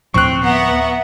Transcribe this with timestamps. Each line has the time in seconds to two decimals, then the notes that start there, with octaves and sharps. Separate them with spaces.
0.14 D2 A2 F3 C4 C#6 F#6
0.44 B3 E5 F#5 A#5